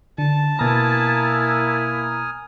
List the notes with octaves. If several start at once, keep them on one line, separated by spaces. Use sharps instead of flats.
D3 A5
B2 A#3 E4 G#5 A#5 D#6 F6